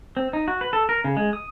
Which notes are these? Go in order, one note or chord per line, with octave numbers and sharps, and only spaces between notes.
C4
D#4
F#4
B4
A4
A#4
C#3
G#3
D#6